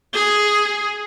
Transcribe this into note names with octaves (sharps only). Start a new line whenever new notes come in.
G#4